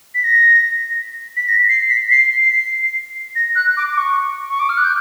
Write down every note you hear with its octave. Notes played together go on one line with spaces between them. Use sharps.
B6
A#6
B6
A#6
C7
B6
C7
C7
A#6
F#6
D6
D6
C#6
C#6
D6
F6
F#6
G6